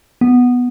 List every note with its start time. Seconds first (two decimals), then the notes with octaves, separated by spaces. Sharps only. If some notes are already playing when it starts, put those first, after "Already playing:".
0.21 B3